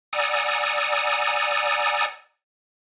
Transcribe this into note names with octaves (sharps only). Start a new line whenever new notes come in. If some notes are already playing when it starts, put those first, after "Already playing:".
D5 F#5 G#5 A#5 D#6 E6